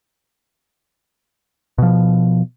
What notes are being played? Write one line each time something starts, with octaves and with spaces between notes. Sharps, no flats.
B2 F3